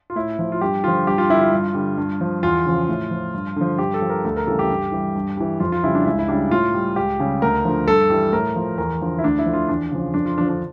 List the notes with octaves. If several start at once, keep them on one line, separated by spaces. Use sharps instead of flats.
F4
A2 E4
F3
F4
G2 G4
D3 F3 F4
G2 G4
F4
D3 G3 E4
F4
G2
D3 G3
G2
F3
E2 F4
C#3 F3
A2
F3
G2
D3 F3
G2 G4
A4
F3
A#4
D2 A4
A#4
C#3 E3 G3 A4
G4
G2
E3 G3
G2
E3 G3
F2 F4
F4
C#3 G3 E4
D4
C#2 E4
E4
C#3 G3 D4
A2 F4
G3
C#2 G4
C#3 G3
D2 A#4
D3 F3
G2 A4
E3 G3
A2 A#4
F3
E2 A#4
D3 F3
E4
D2 D4
E4
D3 F3
F4
E2 D4
C#3 F3
F2 D4
F4
D3 F3 D4
D4